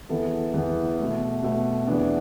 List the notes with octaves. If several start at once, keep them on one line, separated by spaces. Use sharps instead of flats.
E2 E3 B3 A4
E2 E3 B3
B2 A3
B2 A3
E2 E3 B3 D4 D5